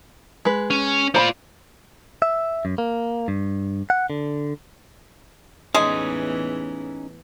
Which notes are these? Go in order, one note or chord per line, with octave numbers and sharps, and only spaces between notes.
G#3 B4
C#4
F4 C5 D5 A#5 B5
E5
F#2
A#3
G2
F#5
D3
E2 A2 E3 G#3 C#4 D#4 G#4